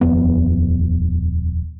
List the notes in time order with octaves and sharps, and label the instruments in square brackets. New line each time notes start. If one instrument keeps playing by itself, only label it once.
[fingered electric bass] D#1 F2 B3